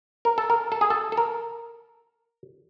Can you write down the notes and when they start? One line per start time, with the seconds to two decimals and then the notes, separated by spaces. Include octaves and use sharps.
0.25 A#4
0.38 A4
0.50 A#4
0.72 A4
0.81 G#4
0.90 A4
1.12 A4
1.17 A#4